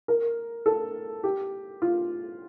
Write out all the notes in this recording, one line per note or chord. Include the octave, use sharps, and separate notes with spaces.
A#4
A4
G4
F4